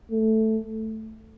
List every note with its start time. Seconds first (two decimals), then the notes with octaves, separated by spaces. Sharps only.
0.11 A3